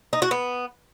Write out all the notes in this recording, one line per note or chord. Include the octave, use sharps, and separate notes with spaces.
D#4
F#4
B3